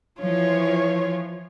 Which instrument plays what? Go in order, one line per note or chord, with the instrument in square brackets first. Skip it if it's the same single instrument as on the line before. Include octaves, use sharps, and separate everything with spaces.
[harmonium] E3 [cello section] F3 F4 [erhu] C#5